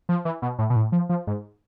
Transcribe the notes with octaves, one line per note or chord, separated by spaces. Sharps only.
F3
E3
B2
A2
B2
A2
F3
F3
G#2